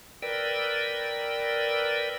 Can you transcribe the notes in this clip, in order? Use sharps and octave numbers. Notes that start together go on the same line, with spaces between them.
A#4 B4 D5 G5 E6